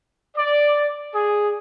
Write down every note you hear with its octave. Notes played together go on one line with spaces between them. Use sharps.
D5
G#4